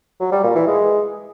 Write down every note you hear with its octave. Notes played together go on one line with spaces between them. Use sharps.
F#3
G3
A#2
E3
G#3